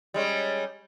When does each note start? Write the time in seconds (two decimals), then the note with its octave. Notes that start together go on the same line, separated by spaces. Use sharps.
0.14 G3 G#3 C#4